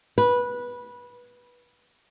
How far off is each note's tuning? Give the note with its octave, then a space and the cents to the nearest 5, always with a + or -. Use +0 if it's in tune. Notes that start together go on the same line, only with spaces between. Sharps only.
B4 -15